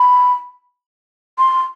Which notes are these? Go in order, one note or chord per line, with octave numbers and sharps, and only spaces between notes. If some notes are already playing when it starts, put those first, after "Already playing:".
Already playing: B5
C6